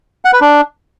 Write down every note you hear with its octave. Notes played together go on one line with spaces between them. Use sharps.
F#5
B4
D4